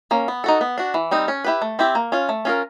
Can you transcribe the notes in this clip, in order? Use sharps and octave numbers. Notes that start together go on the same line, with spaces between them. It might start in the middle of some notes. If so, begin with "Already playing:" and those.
A#3 C#4
B3
D#4 F#4 A4
B3
D4 F#4
E3
G3 C4 D#4
C#4
E4 G4 B4
A3
C4 E4 G4
A#3
C#4 F4
A3
C#4 F4 A#4